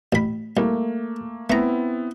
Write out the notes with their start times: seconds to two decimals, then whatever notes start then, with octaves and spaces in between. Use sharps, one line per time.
0.13 A1 B5
0.57 C2 A3 A#3
1.50 A3 B3 C4 E4 A#5